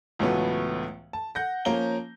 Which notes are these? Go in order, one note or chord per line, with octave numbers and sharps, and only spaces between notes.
C#2 A2 E3 F#3 A3 B3
A5
F#5 G6 A#6
F3 A#3 C#4 A#5 G7